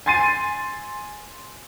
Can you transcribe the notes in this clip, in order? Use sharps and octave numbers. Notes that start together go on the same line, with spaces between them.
G#5 C6 A6 C7 D#7